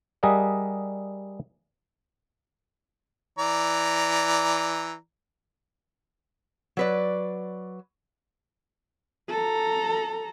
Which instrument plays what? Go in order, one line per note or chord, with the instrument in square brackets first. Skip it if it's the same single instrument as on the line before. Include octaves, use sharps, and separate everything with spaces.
[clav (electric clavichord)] G3 G#4 A#4 D#5 E5 F#5
[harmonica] E3 D5 A#5
[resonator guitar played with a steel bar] F#3 B4 D5
[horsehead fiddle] A4 A#5